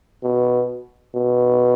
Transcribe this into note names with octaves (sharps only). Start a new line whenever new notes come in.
B2
B2